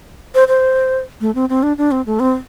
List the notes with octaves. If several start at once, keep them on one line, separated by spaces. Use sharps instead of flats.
C5
C5
A3
C4
C4
D4
D4
C4
A3
C4